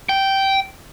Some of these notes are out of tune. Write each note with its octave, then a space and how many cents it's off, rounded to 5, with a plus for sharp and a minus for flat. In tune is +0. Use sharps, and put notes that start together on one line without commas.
G5 -10